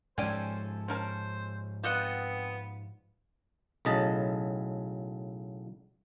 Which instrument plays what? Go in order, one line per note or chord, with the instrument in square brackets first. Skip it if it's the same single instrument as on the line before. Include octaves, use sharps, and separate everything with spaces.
[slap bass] G#2 F3 [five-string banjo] C#4 D5 G5 [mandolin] A4 G#5 [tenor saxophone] C5
[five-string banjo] C#4 A#4 A5 [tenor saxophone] C5
[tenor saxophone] B3 [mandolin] C4 D#5 F#5 [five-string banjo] F4
[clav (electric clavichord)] B1 A2 C#3 D#5 A5